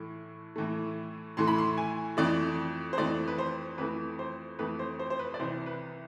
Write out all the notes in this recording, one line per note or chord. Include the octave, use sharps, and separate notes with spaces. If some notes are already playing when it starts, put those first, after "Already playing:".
Already playing: A2 E3 A3
A2 E3 A3
A2 E3 A3 C6
B5
C6
G#5
F2 E3 A3 D5
C5
F2 E3 A3 D5
B4
C5
F2 E3 A3 B4
C5
F2 E3 A3 B4
C5
C5
C5
B4
D5
C2 C3 E3 C5
B4